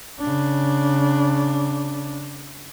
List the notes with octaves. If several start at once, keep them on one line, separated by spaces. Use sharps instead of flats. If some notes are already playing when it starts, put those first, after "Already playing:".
C#3 D4